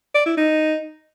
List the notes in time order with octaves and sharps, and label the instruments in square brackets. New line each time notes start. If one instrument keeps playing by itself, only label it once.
[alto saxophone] D5
E4
D#4